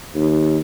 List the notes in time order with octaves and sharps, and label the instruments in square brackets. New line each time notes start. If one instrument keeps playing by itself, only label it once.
[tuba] D#2